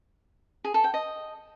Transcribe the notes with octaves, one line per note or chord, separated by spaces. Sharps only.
G#4
A4
G5
D#5